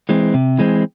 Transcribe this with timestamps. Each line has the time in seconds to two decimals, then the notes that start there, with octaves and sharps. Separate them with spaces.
0.09 E3 G#3 C4
0.34 C3
0.58 E3 G#3 C4